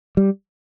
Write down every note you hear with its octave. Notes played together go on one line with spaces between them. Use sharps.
G3